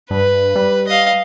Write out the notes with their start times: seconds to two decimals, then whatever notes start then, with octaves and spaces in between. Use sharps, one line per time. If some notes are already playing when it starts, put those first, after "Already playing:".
0.10 G2 B4
0.56 G3
0.88 D#5 F5